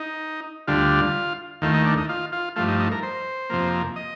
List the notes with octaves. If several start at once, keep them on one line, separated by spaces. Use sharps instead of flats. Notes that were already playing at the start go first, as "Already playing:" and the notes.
Already playing: D#4
D2 D3 G3 F4
D#2 D#3 A3 F4
D#4
D4
D#4
F4
F4
G2 F3 A3 F4
D#4
D#4
A#4
C5
F2 C3 F3 A#3
D#5